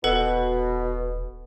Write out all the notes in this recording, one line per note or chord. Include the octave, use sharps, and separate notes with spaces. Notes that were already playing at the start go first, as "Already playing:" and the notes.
D#1 B2 A4 B4 F#5